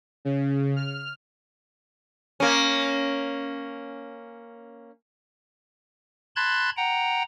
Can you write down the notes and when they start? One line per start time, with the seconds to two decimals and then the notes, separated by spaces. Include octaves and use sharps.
0.25 C#3
0.76 F6
2.40 A#3 C#4
6.36 A5 B5 C6 F#6 G#6 A6
6.77 F#5 G5 A#5